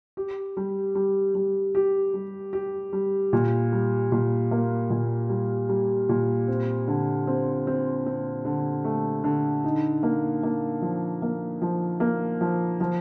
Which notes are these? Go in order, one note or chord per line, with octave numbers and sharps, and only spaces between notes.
G4
G3
G3
G3
G4
G3
G4
G3
A#2
G3
A#2
A#3
A#2
G3
G3
A#2
C4
D3
C4
C4
C4
D3
A3
D3
D#4
A#3
A#3
F3
A#3
F3
A#3
F3
F3